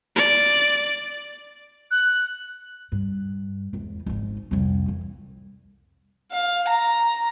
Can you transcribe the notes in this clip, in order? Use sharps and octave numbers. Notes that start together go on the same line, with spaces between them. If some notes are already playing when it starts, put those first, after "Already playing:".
D5
F#6
G2
G#1 E2
G#1 D#4
C2 F2
E3
F5
A#5